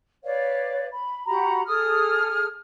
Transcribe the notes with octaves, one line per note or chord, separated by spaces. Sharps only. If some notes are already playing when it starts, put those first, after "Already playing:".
B4 C#5 D5 F5
B5
F#4 G4 A#5 B5
G#4 A4 D#6 F6